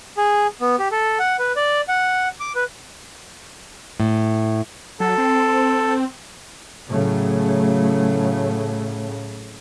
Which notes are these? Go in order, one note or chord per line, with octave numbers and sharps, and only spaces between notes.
G#4
B3
G4
A4
F#5
B4
D5
F#5
D6
B4
A2
F#3 A4
C4
A2 C#3 F#3 A3